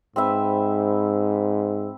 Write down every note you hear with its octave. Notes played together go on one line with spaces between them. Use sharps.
G#2 C4 B4 E5